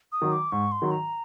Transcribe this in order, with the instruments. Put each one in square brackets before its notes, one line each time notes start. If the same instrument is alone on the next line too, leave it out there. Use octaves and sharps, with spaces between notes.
[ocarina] D#6
[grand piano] D#3 F#3
[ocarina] D6
[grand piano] G#2 [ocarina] C#6
[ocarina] C6
[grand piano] D#3 F#3
[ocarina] A#5